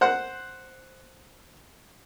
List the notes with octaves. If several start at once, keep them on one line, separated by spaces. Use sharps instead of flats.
C5 F#5 F#6